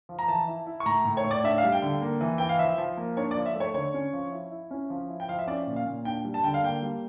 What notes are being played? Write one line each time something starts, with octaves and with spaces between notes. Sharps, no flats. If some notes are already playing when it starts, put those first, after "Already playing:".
F3
A#5
E3 A5
E4
E4
C#6
A2 A#5
A2
C#5
A2
D5
D4 E5
F5
G3
G5
D3
A#3
E3
E3 G5
F5
F3 E5
F3
A#3
D4 C#5
D5
F3
E5
A3 C#5
D3 C#5
C#4
F3
E4
E4
C#4
F3
E4
G5
F3 F5
E5
C#4 D5
A#2
F5
A#2
D4 G5
G3
A5
D3 G5
F5
A#3 G5
G3